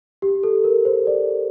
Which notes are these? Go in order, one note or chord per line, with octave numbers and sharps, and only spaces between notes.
G4
A4
A#4
C5
D5